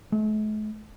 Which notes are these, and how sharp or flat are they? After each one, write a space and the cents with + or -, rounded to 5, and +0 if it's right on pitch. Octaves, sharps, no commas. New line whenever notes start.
A3 -45